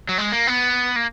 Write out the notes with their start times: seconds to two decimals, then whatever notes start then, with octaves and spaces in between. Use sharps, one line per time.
0.09 F#3
0.18 G#3
0.32 A#3
0.47 B3
0.96 A#3